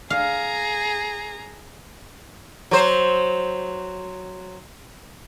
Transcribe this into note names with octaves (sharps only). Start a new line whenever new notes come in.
G#4 F5 A#5
F#3 C5